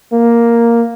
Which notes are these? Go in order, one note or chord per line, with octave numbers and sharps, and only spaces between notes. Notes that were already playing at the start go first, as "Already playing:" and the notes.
A#3